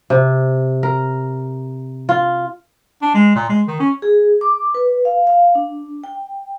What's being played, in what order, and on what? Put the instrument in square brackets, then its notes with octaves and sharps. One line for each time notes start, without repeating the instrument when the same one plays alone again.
[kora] C3
A#4
F4
[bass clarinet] D4
G#3
A#2
G#3
D#3
C#4
[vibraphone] G#4
D6
B4
F5
F5
D4
G5